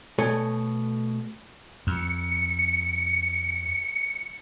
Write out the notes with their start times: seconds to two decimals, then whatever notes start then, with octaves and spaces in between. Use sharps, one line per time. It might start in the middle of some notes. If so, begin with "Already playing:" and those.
0.19 B2 A3 A4 C#5 G#5
1.87 F2 C#7